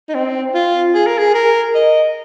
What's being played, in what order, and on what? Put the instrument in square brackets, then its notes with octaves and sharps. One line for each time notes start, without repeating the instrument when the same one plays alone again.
[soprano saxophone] D#4
C4
F4
G#4
A#4
G#4
A#4
D#5